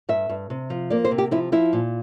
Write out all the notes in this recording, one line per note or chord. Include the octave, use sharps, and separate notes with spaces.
G2 E5
G2
C3
F3
A#3 D5
C5
C3
G4
F3 E4
F3 E4
A#2